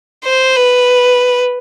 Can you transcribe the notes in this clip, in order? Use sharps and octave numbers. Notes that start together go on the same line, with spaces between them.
C5
B4